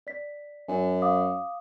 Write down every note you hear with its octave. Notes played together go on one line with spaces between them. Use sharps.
D5 B6
F#2 G#5
F5 D6 D#6